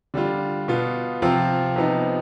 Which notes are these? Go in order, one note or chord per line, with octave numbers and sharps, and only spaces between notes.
D3 G3 D4 F4
B2 B3 F4
C3 F3 C4 F4
C3 F3 B3 D#4